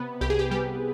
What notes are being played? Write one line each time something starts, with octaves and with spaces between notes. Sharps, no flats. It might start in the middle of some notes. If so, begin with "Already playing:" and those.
Already playing: C3 B3 B4
C2 G4
G#4
G4
G3 G4